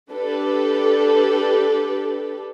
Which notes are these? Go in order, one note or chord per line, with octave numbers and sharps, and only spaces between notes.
D4 G4 A4 B4